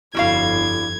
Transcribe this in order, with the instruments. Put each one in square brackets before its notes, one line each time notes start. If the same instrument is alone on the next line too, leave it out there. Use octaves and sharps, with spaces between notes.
[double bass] G1 F2 [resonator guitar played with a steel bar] G3 F#4 F5 [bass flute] E4 [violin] G#6